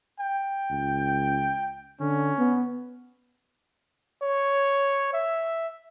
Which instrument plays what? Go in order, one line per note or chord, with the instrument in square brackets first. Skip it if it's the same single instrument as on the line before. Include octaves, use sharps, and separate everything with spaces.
[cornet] G5
[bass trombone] C#2
[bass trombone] D3 [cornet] C#4
[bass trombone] B3
[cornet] C#5
E5